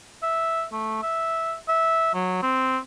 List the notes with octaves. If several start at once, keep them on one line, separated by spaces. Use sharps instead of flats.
E5
A3
E5
E5
F#3
C4